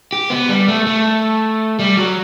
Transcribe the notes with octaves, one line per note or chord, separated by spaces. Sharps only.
G4
B3
G3
A3
A3
G3
F#3